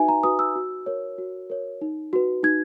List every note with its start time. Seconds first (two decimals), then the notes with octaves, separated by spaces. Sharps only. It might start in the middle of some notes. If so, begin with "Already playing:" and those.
Already playing: D#4 F#4 B4 E5 G#5
0.08 A#5
0.23 F#4 B4 D#6
0.39 E6
0.56 F#4
0.86 A#4 C#5
1.18 F#4
1.50 A#4 C#5
1.81 D#4
2.13 F#4 B4
2.43 D#4 G#6